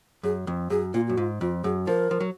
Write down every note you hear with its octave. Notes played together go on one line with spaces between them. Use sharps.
F#2 G#4
F2
F#2 G#4
A#2 F4
F#2 F#4
G#2 F4
F2 F4
F#2 G#4
F3 A#4
F3
F#3